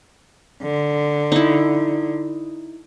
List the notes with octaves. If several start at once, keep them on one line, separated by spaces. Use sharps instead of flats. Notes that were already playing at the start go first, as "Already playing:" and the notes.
D3
D#4 E4